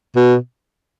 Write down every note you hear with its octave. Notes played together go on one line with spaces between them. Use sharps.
B2